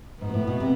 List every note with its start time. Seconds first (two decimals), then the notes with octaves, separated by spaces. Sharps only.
0.21 G#2 B3
0.29 B2
0.34 A2
0.47 B2
0.60 C3